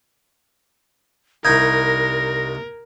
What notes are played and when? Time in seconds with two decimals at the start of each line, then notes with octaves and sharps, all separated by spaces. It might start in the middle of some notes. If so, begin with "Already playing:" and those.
1.45 C2 D#4 A#4 G6 G#6 A#6